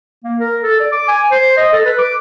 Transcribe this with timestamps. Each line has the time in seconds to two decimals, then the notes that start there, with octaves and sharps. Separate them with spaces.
0.24 A#3
0.40 A#4
0.63 A4
0.80 D5
0.92 D6
1.08 G#5
1.31 C5
1.57 D#5
1.73 A4
1.86 B4
1.99 D6